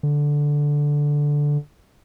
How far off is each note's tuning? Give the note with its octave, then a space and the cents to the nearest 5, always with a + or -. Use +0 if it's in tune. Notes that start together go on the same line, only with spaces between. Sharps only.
D3 -5